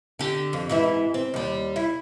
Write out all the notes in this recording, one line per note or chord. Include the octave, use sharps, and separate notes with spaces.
D3 G4
F2
G#2 E3 E4
C4
D#2 G3
E4